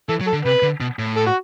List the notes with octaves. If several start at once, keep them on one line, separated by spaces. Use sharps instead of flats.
E3 A4
F#3
A4
D3
C3 B4
D3
B2
A2
A4
F#4